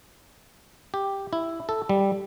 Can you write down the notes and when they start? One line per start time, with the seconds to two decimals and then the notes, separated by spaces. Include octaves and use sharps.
0.94 G4
1.33 E4
1.69 A4
1.89 G3